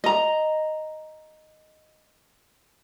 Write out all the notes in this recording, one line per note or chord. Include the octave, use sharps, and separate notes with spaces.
D#5 A#5